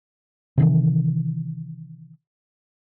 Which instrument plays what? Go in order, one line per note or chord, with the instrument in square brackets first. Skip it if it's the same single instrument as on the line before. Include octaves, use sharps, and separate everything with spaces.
[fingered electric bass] C3 D#3 E3